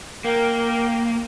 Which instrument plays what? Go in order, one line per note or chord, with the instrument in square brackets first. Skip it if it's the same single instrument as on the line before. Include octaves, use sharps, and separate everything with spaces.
[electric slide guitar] A#3 [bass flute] A#4 [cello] G5